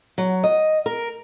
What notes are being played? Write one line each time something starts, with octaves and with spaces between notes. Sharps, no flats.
F#3
D#5
A#4